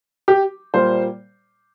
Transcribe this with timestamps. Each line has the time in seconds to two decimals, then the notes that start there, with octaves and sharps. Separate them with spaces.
0.28 G4
0.74 A#2 G3 A#3 C5